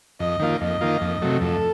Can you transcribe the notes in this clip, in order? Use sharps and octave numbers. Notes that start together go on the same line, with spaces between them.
F2 D#5
D#3 A#3 F4
F2 D#5
D#3 A#3 F4
F2
C3 F#3 A3
F2 A4